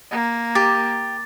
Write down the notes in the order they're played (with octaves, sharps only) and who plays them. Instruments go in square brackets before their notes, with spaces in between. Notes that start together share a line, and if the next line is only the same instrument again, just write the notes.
[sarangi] A#3
[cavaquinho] G4 [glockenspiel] A6